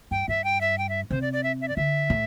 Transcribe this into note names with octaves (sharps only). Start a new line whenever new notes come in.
G2 G5
G2 E5
G5
E5
G5
E5
C3 C5
D5
D5
E5
E5
D5
D3 E5
A2